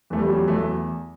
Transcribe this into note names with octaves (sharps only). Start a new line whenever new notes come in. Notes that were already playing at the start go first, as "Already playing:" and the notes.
E2 A3
G3
F#3
E2 A3